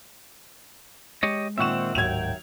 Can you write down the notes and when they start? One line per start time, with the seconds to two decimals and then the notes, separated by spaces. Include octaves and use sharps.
1.23 G#3 G4 C#5 D#5
1.58 A#2 D#3 C4 E5 F#5 C#6 E7
1.95 D1 D#2 G#2 F#3 G5 G#6 F7